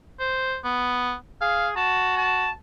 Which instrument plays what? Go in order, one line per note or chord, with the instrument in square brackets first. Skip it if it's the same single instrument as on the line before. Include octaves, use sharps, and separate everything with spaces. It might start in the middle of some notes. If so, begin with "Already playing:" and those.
[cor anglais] C5
B3
[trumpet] G#4 [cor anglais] F5
[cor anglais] F#4 [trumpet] A5
[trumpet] A5